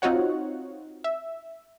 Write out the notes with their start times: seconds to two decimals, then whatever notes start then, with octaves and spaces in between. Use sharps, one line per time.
0.02 C4 D#4 F4 F#4 C#5 F#5
1.04 E5